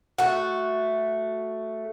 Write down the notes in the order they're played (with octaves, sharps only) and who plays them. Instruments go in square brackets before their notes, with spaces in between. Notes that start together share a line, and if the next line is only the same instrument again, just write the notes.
[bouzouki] A3 F#4 [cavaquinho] F#5